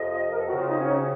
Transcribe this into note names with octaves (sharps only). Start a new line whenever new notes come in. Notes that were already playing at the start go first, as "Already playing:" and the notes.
Already playing: F2 C3 F3 D#5
A#4
A4
C#3 F#3 C4 F#4
F4
D#4
C#4